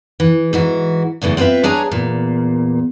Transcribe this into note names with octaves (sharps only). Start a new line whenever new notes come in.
E3
G#2 E3 F#4
E2 C#3 E3 A3
C4 F4 F#4 B4 E5
D4 G#4 C#5 G#5 A#5
E2 A#2